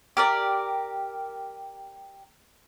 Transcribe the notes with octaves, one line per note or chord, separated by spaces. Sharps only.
G4 A#4 D5